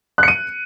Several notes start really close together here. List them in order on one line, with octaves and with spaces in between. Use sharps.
F#6 C#7 D#7